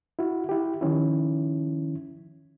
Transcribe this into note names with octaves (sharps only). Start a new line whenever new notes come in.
E4 F#4
E4 G4
D#3 F3 C#4 E4